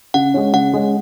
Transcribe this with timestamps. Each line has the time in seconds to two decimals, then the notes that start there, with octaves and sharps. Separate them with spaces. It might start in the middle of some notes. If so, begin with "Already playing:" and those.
0.14 C#3 F#5
0.34 G#3 C#4
0.53 C#3 F#5
0.74 G#3 C#4